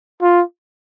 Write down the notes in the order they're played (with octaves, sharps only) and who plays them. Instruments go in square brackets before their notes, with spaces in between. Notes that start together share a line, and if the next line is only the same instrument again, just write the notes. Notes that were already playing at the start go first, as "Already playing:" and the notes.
[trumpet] F4